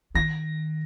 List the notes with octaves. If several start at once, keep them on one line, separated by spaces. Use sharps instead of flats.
D#3 A#6